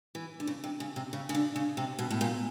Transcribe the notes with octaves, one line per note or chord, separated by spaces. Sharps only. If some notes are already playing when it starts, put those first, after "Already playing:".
E3
D3
C#3
C3
C#3
C3
C#3
C#3
D3
C#3
C3
B2
A2
A#2